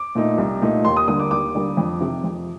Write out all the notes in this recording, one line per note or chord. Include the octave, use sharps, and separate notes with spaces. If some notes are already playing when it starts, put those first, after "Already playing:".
Already playing: D6
A#2 A3 D#4
C2
A#2 A3 D#4
D#2 C6
D#6
D3 G3 A#3 D#6
D6
D#2 D6
D3 G3 A#3
F2
C3 D#3
F2